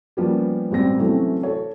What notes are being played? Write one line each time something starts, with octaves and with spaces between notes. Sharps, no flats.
F3 G3 A#3 B3 C#4
E1 A1 G3 C4 A#6
C3 E3 F#3 A3 C4 C#4
A4 C#5